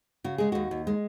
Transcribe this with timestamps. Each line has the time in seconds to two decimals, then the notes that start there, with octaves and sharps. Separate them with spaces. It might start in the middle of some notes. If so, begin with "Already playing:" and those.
0.24 C#3 F#4
0.38 G#3 G#4
0.52 D#2 F#4
0.71 D#2
0.87 G#3